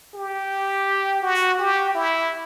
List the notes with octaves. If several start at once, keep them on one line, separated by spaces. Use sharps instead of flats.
G4
F#4
G4
E4